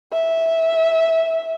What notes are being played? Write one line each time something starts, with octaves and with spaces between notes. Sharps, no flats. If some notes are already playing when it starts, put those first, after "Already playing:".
E5